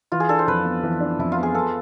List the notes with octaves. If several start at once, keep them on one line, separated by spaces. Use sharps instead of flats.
E3 F4
G#4
D4 A4
C5
F2 B4
B3
E3
D4
F2 E4
F4
B3
G#4
B3 A4